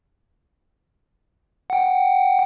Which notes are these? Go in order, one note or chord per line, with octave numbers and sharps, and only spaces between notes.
F#5 G5